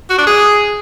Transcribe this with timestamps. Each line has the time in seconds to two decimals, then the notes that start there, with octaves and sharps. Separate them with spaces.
0.10 F#4
0.18 D4
0.27 G#4